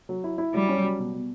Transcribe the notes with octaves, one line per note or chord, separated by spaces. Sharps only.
F#3
E4
E4
F#3 G3
C#4
F#3
B2
B2